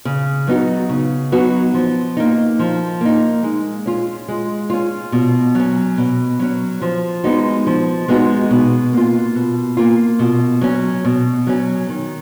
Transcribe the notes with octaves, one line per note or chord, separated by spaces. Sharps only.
C#3
F#3 B3 D#4 F#4
C#3
F#3 B3 D#4 F#4
F3
A#3 D#4
F3
A#3 D#4
G#3
C#4 F4
G#3
C#4 F4
B2
F#3 C#4
B2
F#3 C#4
F3
G#3 B3 D#4 F#4
F3
G#3 B3 D#4 F#4
B2
A#3 F4
B2
A#3 F4
B2
F#3 C#4
B2
F#3 C#4
D#3